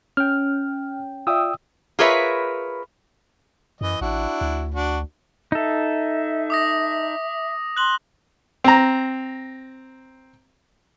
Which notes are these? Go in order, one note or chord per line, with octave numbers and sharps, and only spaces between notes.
C#4 G5 F6
F4 D5 E5 G5 D#6 E6
F4 G#4 A#4 B4 C#5 E5
F#2 E3 D#5
A1 D4 E4 F#4
D2
D4 F#4
D#4 A4 E5
D6 D#6 A#6
C6 F#6 F#7
C4 A#5